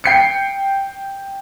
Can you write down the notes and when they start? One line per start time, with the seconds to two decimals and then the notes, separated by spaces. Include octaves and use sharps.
0.04 G5 C7 C#7